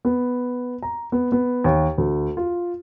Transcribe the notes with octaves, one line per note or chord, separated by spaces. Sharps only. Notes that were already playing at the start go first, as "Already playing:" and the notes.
B3
A#5
B3
B3
D#2
D2
F4